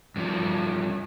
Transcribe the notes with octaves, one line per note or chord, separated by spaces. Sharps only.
G2 F3